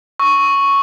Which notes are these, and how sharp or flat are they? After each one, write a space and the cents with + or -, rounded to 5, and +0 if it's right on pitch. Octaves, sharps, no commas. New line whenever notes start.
C#6 +0 E6 -15